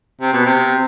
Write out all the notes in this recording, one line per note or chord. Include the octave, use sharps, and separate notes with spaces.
C3
B2
C3